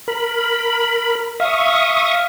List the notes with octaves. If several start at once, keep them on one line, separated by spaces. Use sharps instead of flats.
A#4 B5
E5 F5 C#6 D#6